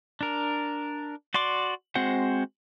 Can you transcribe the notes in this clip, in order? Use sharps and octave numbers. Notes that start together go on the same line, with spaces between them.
D4 A#4
F#4 D5 C6 D6
G#3 C4 F#4 C5 F#5